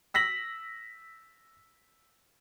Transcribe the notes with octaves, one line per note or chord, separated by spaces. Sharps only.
E6 A#6 B6 F#7